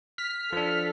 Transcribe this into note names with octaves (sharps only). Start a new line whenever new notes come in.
F6 B6
F3 D4 A4